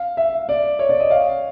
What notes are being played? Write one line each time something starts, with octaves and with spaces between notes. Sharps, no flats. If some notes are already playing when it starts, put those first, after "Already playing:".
Already playing: F5
E5
D5
C#5
D5
D#5
F5